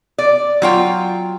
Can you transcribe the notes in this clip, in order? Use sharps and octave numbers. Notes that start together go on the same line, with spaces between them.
D5
F#3 F4 G5